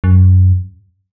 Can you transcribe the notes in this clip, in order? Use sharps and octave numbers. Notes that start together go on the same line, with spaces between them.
F#2